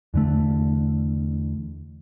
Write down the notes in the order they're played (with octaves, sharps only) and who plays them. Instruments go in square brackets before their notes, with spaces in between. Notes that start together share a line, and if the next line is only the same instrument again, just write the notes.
[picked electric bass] E2 D3 A3